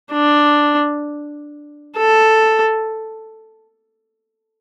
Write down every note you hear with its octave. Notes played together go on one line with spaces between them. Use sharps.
D4
A4